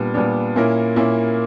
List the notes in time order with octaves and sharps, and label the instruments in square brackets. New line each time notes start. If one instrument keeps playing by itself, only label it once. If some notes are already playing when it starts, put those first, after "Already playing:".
Already playing: [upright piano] A#2 G3 B3 D4
A#2 G3 B3 D4
A#2 A#3 C#4 E4 A#4
A#2 A#3 C#4 E4 A#4